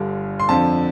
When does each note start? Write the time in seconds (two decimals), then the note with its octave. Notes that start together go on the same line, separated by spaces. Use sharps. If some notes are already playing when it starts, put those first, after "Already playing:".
Already playing: G1 G2 D3 G3
0.40 C6
0.49 F2 D3 F3 A5